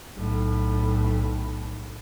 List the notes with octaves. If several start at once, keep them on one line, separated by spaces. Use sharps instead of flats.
B1 A2